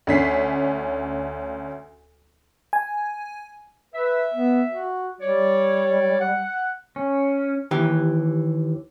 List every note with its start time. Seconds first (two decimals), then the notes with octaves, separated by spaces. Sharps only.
0.07 D2 C#4 B6 C7
2.73 G#5
3.94 B4 E5
4.34 B3
4.69 F#4
5.21 G3 C#5 D5
6.20 F#5
6.96 C#4
7.71 D#2 E3 G4